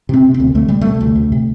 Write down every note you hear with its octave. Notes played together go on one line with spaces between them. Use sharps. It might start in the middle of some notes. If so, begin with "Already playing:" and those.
C3 C4
C3
C4
D2
D2 A3
C3 G3
C3 A3
D2
D2
C3